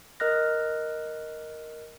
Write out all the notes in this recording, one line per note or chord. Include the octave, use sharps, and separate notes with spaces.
A#4 D#5 F6 F#6 A#6